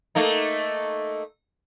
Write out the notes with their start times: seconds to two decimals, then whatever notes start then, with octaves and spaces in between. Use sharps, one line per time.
0.15 A3 A#3 D#4